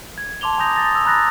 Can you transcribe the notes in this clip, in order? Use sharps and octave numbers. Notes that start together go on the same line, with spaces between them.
G#6
A5 C6 D6 F7 G7
G#5 A#5 D#6 G6 A#6 F7
D#6 A6 A#6
D#6 E6
A#5 B5 F#6 A6 A#6